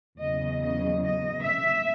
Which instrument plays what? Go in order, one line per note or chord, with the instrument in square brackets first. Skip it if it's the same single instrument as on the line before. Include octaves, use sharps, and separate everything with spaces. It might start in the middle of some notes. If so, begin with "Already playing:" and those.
[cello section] E2 C#3 F#3 D#5
D#5
D#5
E5